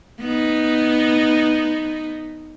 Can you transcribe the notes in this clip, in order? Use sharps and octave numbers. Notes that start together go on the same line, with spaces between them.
B3 D#4